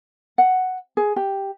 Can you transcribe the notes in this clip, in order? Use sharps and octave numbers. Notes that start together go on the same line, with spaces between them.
F#5
G#4
G4